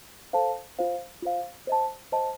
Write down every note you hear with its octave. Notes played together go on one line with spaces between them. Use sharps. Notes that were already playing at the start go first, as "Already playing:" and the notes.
A4 C5 F5 A5
F4 C5 F5
F4 C5 F5
C5 D#5 A5
C5 D#5 A5